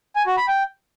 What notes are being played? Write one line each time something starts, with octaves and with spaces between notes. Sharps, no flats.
G#5
F#4
B5
G5